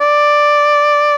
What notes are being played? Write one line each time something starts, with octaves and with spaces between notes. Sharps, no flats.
D5